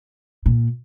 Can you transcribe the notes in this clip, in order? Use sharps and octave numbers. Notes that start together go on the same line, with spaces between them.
A#2